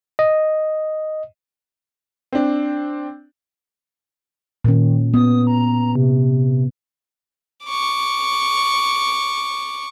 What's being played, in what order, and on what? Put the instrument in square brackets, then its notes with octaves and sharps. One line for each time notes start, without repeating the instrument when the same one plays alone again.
[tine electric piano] D#5
[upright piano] C4 D4
[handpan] A#2 C#4 [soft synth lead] D#3
[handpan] B3 [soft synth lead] D#6
[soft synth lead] A#5
C3
[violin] C#6 D6